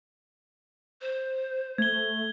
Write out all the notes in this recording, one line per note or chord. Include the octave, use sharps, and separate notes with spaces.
C5
A3 G#6 G7